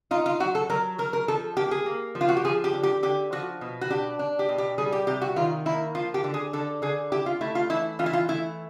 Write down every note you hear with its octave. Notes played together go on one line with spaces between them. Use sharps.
D#4 F4
F4
F#3 F#4
A4
F#3 A#4
F#3 A#4
A#4
F3 A4
A#3 G4
G#4
A#3
F3
F4
F#4
G4
F3 G#4
G4
D3
G4
D3 G4
F3 F#4
B2
F#4
D4 G4
D4
G4
B2
G4
G3 G#4
G4
C3 G4
F#4
D#3 F4
A#3 E4
F3 F4
G4
D3
G#4
D3 A4
D3 G#4
E4 G4
F4
A3 E4
F4
E3 E4
E3 F4
E4
F4
A3 E4